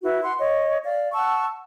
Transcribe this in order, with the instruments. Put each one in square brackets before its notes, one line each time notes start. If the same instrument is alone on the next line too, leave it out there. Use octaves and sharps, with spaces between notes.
[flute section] E4 F#4 B4
F#5 C6
C#5 D#5
D5 F5
F#5 A5 C#6 E6